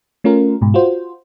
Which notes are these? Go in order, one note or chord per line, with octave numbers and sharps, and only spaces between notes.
A3 C#4 F4 A#4
G#2 B2
F4 F#4 C5